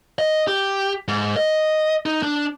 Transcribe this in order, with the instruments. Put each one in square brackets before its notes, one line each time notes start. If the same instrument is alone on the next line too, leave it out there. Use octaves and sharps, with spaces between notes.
[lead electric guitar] D#5
G4
G#2
D#5
D#4
D4